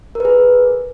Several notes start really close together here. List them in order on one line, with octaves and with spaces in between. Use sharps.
A#4 B4 G#4